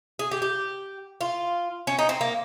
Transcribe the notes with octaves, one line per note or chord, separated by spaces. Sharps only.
G#4
G4
G4
F4
C#4
D#4
C4
A#3